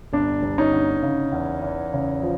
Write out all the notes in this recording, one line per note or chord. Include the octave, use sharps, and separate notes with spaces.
G1 D4
G1
C#4 D#4
D3
C#3
E2
E2
C#3
F3